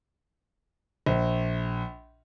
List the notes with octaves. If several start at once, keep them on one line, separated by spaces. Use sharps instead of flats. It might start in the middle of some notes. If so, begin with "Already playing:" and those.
A#1